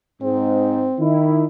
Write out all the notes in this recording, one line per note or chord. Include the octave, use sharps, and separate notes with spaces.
G#2 C4
D#3 E4